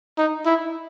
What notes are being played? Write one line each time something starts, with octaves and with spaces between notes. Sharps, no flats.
D#4
E4